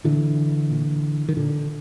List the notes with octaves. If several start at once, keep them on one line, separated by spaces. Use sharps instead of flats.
A#2 D3 E3
A#2
D#3
A#2 D3